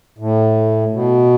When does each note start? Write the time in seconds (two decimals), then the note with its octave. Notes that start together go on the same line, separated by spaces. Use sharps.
0.18 A2
0.93 B2